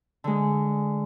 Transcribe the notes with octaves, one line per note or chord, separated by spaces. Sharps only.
D3 G#3